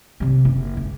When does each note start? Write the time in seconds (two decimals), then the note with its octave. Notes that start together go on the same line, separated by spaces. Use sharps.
0.20 C3 G3
0.45 F#1
0.77 C#2